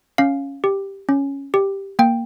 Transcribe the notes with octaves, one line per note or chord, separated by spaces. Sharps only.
C#4 F5
G4
C#4
G4
A#3 G5